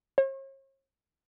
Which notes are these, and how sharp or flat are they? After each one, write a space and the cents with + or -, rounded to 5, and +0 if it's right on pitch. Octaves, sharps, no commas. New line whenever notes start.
C#5 -45